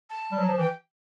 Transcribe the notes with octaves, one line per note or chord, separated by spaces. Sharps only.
A5
G3
F#3
F3
E3 G5